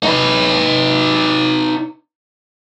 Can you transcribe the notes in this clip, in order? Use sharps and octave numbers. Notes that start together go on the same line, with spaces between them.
D#4 B4